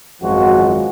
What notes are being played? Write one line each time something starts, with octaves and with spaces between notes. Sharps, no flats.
G#1 F#2 F3 G#3 F#4